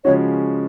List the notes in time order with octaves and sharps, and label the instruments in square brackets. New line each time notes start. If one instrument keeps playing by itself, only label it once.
[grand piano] C#3 F3 G#3 C#4 F#4 [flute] C#5